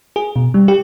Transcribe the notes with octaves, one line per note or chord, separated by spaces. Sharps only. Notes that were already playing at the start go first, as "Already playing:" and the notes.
G#4
B2
G3
G4